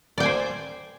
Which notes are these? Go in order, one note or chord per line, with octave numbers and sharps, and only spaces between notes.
C5 D5 G5 G#5